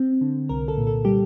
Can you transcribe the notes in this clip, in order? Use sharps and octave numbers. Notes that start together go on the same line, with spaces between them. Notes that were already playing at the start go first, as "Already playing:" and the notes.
Already playing: C4
D3
C2 A#4
A4
A#2
A4
G3 G4